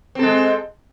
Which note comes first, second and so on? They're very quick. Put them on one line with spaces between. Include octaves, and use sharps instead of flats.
C4 A4 G#3